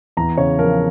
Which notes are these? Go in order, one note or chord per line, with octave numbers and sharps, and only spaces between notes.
E2 A#5
C#3 C#5
F3 A#4